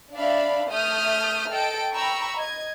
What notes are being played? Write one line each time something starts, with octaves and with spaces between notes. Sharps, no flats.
D4 D5 E5 F5 B5
A3 E5 D#6 F6 G6
A4 D#5 G5 D7
G5 A#5 B5 C#6 E6
D#5 G#6